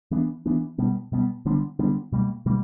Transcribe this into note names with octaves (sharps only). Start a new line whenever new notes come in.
E3 B3 D4
E3 B3 D4
B2 G3 B3
B2 G3 B3
D3 G3 B3 D4
D3 G3 B3 D4
B2 G3 A#3
B2 G3 A#3